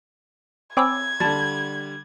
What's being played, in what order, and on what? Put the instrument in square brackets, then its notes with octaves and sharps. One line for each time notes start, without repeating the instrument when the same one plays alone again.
[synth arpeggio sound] C4 C#5 D6 [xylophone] G#5 B5 E6 [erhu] G#6
[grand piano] D3 G3 [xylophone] A5 A6